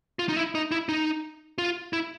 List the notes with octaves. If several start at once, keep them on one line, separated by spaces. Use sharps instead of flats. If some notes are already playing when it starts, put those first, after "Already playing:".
F4
D#4
E4
D#4
E4
D#4
F4
E4